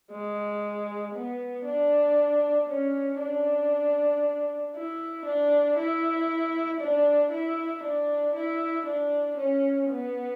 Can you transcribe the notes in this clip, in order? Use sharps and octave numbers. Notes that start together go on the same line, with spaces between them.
G#3
B3
D4
C#4
D4
E4
D4
E4
D4
E4
D4
E4
D4
C#4
B3